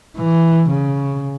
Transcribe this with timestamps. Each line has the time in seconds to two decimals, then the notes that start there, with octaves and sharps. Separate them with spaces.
0.17 E3
0.71 C#3